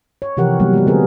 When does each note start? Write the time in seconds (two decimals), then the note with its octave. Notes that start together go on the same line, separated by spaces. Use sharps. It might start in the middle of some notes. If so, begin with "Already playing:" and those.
0.22 C#5
0.37 C3 E3 F3 G4 A#4 F#5
0.60 F#3 G3 A#3 B3
0.73 G#3 B3 F#4
0.87 D3 G3 B3 C4 G#4 A#4